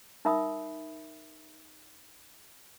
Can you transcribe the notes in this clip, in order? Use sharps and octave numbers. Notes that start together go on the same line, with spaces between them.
D#4 A#4 E5 B5 D#6